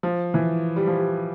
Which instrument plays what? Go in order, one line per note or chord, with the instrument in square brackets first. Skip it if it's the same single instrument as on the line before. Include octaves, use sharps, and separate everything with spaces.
[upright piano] F3
E3
G3
F3
G3